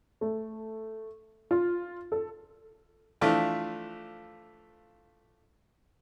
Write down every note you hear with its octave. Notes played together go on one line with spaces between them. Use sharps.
A3
F4
A4
E3 F3 A3 D4 F4